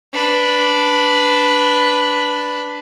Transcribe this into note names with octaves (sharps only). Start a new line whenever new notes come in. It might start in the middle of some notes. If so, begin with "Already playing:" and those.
D4 B4